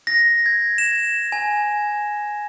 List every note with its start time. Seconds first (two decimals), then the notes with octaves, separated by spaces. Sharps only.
0.07 A#6
0.46 G#6
0.78 E7
1.32 G#5